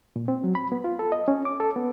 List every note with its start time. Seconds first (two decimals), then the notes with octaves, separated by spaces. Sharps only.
0.16 A#2
0.28 C4
0.44 F#3
0.55 B5
0.72 B3
0.84 F4
0.99 A4
1.12 D#5
1.28 C#4
1.45 D6
1.60 A4
1.76 B3